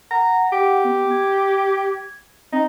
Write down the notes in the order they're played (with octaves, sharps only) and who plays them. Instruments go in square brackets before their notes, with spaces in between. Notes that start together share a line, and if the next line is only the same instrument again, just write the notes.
[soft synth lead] F#5 [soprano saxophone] A#5
[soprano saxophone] G4
[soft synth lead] B3
G#6
[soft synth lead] C4 [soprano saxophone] D#4